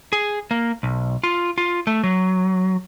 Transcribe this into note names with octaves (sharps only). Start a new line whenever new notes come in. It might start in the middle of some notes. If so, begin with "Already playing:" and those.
G#4
A#3
B1
F4
F4
A3
F#3